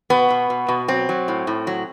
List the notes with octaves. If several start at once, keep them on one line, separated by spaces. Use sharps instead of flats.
B2 B3
B2
B2
B2
F#3 C4
F#3
A2
A2
F#3